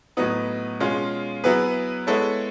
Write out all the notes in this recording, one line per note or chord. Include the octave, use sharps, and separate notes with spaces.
A2 F#3 B3 D#4
B2 G#3 C#4 F4 G#4
F#3 B3 E4 G#4 B4
G#3 B3 E4 A4 C#5